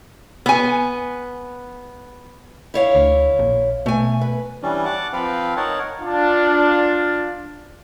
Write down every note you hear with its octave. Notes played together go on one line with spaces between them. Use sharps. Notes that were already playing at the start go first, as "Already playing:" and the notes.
B3 G#5
E4 C#5 F5
D2
A#1
B2 A3 G#5
B4
E3 G3 C#4 D4
F#5 A5 D6
F3 C4 B4 F5
D#4 A#4 C#5 F#5 A5
D4 F4